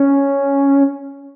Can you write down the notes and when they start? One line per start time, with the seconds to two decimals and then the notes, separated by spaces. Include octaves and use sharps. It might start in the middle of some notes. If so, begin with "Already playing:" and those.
Already playing: C#4